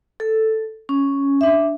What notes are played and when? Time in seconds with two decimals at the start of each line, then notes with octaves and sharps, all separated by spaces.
0.20 A4
0.89 C#4
1.41 D4 E5